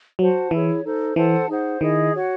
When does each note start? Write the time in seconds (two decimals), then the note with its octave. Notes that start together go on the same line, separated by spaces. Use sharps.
0.19 F#3 F#4 C5 F#5 A5
0.51 E3 E4 G#4 C#5
0.84 D#4 A4 C5
1.16 E3 A4 C5 F#5 A5
1.48 D#4 G#4 C5 F#5
1.81 D#3 E4 G#4 D#5
2.14 F#4 C#5 F#5